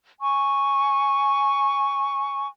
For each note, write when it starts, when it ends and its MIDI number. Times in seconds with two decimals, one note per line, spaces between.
0.21 2.47 80
0.21 2.47 85